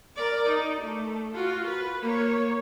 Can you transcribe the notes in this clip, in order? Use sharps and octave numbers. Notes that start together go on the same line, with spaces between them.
A#4 D5
D#4
A3
F4 F#4
B4
A#3 C#5